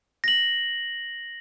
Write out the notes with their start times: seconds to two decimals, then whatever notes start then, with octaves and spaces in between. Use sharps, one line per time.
0.24 A#6 F#7